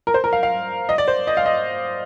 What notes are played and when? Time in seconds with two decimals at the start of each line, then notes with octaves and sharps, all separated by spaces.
0.07 A#4
0.14 C5
0.24 A#4
0.33 F5
0.43 F5
0.89 D#5
0.98 D5
1.08 C5
1.27 D#5
1.37 F5
1.46 D#5